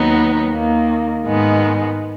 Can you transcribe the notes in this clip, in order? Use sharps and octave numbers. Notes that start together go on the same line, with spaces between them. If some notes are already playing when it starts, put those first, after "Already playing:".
Already playing: D#2 D#3 F#3 B3 D#4
D#2 D#3 A#3
G#2 D#3 G#3 B3